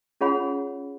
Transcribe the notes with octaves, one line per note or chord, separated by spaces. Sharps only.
C#4 F4 G#4 C#5 F#5 B5